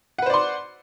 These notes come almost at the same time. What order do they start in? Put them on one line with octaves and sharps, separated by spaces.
F#5 B4 C5 D5 C6